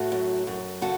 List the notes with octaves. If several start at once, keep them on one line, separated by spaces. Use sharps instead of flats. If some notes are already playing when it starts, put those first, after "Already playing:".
Already playing: A2 F#4 A4
F#2
F#2
C#3 F#4 A4